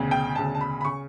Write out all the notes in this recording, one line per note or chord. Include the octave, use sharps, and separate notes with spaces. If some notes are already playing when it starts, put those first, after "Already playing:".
Already playing: E1 D2 C#3
G5
E1 D2 C#3 A5
A5
B5
B5
C#3 C#6